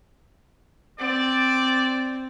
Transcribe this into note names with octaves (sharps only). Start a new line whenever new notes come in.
C4 D5